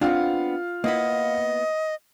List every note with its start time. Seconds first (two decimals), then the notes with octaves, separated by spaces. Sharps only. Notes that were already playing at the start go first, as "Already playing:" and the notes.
0.01 B3 C4 D4 F4 F5
0.84 A#3 B3 E4 D#5